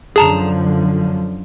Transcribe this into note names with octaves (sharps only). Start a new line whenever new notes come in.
F#2 D3 F3 G#4 A5 A#5